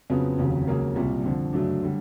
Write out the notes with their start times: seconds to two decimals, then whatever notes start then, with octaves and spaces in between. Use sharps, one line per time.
0.10 F2 C#3 F#3 B3
0.38 F1 D#2 C#3 F#3
0.68 C#2 C#3 F#3 A#3
0.95 C2 A#2 G3
1.24 F2 D3 F3
1.53 F#2 C#3 F#3 A3 D4
1.83 D3 G3